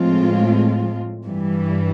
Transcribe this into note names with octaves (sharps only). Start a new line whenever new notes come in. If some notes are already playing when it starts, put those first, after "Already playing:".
Already playing: A2 F3 G#3 C4 F4
G2 E3 G3